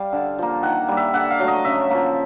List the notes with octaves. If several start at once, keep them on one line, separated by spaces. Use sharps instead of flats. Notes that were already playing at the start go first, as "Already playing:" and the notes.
Already playing: G3 F5
D3
F3 A#3
D#3 F#5
G3 A#3
E5
D3 F#5
F5
F#3 A3
D#5
C#3 E5
F3 A#3